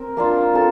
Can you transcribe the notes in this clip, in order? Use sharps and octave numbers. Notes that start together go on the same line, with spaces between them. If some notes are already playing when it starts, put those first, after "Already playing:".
Already playing: C4 A#4
A#3 D4 F4
C4 F4 A4